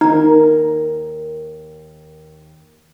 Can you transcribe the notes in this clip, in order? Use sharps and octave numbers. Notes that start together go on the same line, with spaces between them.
D#2 D#4 A#4